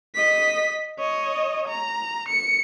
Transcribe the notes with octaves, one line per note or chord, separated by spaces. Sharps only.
D#5 B6
C#5 D#5
A#5
C#7